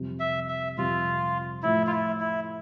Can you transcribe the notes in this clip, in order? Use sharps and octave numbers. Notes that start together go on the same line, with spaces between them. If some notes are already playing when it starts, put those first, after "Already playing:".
Already playing: F2 C3 G3
E5
E5
F2 C3 G3 F4
A2 F3 A3 E4
F4
E4
E4